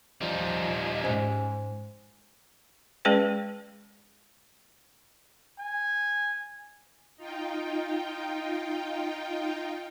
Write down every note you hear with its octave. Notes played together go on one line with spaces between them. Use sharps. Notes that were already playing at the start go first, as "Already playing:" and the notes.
F3 G3 D#4
G#2 C#4 C5 G#5
G#3 C#4 G#4 B4 D5 G5
G#5
D#4 F4 G5